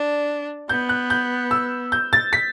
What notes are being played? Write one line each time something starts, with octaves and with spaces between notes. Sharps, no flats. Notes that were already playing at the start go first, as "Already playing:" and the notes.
Already playing: D4
B3 G6
F#6
G6
E6
G6
A6
B6